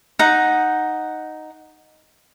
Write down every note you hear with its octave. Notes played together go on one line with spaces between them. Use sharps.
D#4 F#5